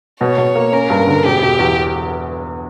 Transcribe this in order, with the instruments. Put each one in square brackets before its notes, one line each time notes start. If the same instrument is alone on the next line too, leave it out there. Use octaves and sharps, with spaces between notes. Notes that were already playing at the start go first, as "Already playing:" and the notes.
[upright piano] B2 [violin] C#5
[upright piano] B2
A#3
[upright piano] C#4 [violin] A#4
[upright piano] G2
D3
[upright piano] E1 [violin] G4
[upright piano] E1
E2